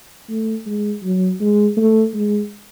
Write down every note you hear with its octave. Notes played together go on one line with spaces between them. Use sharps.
A3
G#3
F#3
G#3
A3
G#3